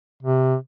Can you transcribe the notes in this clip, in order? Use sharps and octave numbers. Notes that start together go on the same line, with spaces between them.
C3